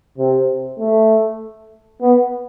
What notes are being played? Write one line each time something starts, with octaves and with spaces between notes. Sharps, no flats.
C3
A3
B3